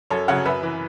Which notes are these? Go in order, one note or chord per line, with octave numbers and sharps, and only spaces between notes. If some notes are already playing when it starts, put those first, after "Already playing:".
F#2 A4 C#5
C#3 F#3 C#5 F#5
F#2 B4 E5
E3